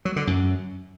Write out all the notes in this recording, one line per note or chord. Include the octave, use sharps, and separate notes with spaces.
F#3
D3
F#2